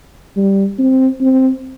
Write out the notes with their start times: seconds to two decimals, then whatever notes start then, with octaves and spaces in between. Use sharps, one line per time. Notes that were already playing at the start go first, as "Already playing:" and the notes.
0.36 G3
0.79 C4
1.21 C4